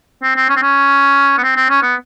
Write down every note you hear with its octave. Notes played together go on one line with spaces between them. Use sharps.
C4
C4
C#4
C4
C#4
B3
C4
C4
C#4
B3